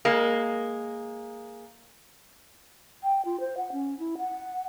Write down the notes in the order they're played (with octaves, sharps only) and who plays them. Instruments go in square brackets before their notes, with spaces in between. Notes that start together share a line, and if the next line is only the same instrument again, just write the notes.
[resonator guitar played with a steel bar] G#3 A#3
[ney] G5
F4
C5
F#5
C#4
E4
F#5